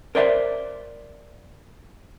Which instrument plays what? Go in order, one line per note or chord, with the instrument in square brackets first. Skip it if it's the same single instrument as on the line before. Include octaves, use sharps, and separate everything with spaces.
[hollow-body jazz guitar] A#4 C5 D5 E5 G#5 C6